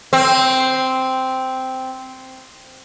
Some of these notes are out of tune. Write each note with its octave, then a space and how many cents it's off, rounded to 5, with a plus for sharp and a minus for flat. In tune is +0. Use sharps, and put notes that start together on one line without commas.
C4 -5